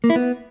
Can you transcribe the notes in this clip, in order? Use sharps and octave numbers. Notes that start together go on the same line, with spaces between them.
A#3
E4
B3